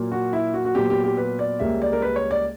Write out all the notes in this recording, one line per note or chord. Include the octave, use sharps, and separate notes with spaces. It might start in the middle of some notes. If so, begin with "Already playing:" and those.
Already playing: A#2 F#3 A#3
F#4
E4
F#4
F#4
A#2 F#3 B3 G4
G4
G4
B4
D5
C#2 C#3 G3 A#3 E5
D5
A#4
B4
C#5
D5